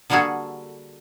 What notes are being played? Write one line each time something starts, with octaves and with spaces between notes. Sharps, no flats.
D3 G3 A#3 F#4 G#4 A4